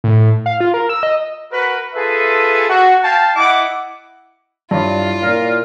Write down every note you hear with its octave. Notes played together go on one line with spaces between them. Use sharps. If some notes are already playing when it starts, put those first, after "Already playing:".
A2
F5
F4
A#4
E6
D#5
F#4 A#4 B4
F4 G#4 A4 B4 E5
F#4
F5 G5 A5
E4 D#5 F#5 D6
G2 E4 F4 C#5 D5
A#2 A#3 A#4